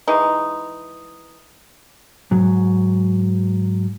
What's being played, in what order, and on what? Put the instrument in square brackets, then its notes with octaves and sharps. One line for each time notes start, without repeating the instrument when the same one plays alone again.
[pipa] E3 G#3 D#4
[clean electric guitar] G#2 F#3